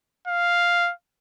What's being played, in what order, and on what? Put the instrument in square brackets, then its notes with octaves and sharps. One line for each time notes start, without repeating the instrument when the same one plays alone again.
[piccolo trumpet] F5